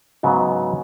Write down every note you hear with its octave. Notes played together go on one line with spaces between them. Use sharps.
G#2 C#3 F#3 B3